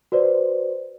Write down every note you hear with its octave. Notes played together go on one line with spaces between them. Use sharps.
F#4 B4 C5 D5